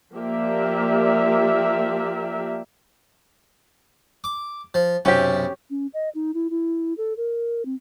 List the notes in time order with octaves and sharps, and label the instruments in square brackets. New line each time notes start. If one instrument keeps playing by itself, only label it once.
[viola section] F3 A#3 G4 A#4 D5 E5
[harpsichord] D6
F3
[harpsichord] B1 F#2 C3 [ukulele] C#4 G4
[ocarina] C#4
D#5
D#4
E4
E4
A4
A#4
C4